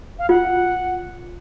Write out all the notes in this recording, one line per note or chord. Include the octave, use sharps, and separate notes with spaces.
F5
F4 F#5